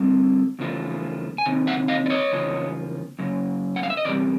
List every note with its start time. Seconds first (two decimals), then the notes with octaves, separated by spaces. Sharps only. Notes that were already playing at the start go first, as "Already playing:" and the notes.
Already playing: D3 G3 C4
0.59 E2 C#3 F3 A3
1.38 G#5
1.45 C3 D#3
1.67 E5 F#5
1.88 D#5 F5
2.06 D5
2.10 C#5 D#5
2.32 E2 C#3 F3
3.19 F#2 C#3
3.76 F#5
3.83 F5
3.90 E5
3.97 D#5
4.05 E2 C3 G3 D5